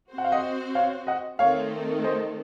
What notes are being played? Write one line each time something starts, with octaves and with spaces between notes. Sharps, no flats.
C4 F#4 C5
F#5
F5
D#5 F#5
C#5 F5
D#5 F#5
D#3 A3 C4 D#4 A4 C#5 F5
C5 D#5